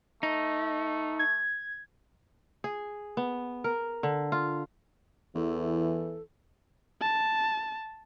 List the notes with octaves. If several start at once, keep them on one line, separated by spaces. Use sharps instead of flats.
A3 D#4
G#6
G#4
B3
A#4
D3
F4
E2 E3 A4
A5